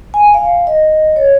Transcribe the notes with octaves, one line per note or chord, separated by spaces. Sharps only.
G#5
F5
D#5
C#5